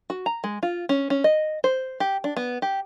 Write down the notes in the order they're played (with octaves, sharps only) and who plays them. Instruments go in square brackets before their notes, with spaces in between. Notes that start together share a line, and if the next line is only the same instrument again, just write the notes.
[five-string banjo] F#4
A#5
G#3
F4
C#4
C#4
D#5
C5
G4
D4
B3
G4